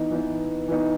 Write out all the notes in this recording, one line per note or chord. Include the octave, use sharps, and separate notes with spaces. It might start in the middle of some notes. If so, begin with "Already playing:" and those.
Already playing: E3 B3 D#4
E3 B3 D#4
E3 B3 D#4